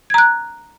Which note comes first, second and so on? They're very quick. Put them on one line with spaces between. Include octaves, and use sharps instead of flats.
G#6 A#5 F#6